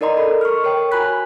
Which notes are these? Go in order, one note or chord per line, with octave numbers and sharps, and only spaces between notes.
D#4 A#4 D5 D#5 A#5 C6
A4 A#4 B5
C#6 F6
A#4 C#5 G5
F#4 G#5 A#5 B5 F#6 B6